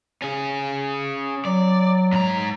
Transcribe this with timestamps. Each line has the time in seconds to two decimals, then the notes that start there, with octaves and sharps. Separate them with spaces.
0.22 C#4 G#4
1.45 F#3 D5
2.12 G#2 A#5